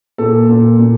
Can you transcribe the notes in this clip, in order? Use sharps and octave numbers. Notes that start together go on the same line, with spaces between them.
A#2 A4
A#2
A#2